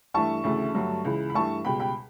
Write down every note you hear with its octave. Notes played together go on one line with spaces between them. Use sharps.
G2 E3 A3 A5 C#6
D2 C#3 E3 A3
G2 D3 F#3 A3
C#2 C#3 E3
B5
G2 E3 A3 A5 C#6
C#2 B2 G3 G5 B5
G5 B5